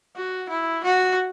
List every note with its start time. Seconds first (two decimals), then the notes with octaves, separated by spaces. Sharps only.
0.16 F#4
0.49 E4
0.84 F#4